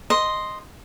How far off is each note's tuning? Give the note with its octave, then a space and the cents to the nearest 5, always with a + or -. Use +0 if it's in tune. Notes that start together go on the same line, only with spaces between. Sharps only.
D#5 +0 C6 +0